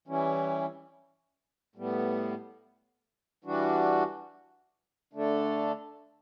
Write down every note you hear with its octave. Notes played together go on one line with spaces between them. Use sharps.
E3 G3 C#4 E4
A2 G3 B3
E3 G3 D4 F#4
D3 A3 D4 A4